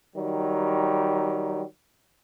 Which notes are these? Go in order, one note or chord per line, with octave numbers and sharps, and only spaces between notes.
D#3 F#3 G3